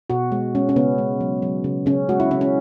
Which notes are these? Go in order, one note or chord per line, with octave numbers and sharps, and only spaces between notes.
B2 F#4
G#3
G#3 C#4
C#4
C#3 B3
G#3
F#3
F#3
C#3
C#3 C#4
G#3 F#4
E4
C#3 C#4
C#4